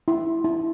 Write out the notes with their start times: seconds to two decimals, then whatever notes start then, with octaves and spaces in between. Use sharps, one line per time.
0.08 E4
0.44 E4